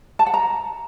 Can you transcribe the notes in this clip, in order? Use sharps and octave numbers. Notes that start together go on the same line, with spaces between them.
A5
F#5
A#5